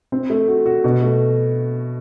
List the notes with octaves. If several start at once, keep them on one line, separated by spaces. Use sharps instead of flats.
C4
A3
F#4
F#4
B2
A3